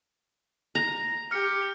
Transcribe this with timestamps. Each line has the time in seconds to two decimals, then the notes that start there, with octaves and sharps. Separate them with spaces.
0.75 A#5
1.31 G4 F6 C#7